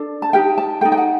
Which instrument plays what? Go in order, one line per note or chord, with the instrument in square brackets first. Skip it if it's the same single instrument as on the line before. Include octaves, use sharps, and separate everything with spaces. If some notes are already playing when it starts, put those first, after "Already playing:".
Already playing: [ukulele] D4 A4
A5
D#4 G4 A#4 G5
A5
D#4 A4 G5
G5
F#5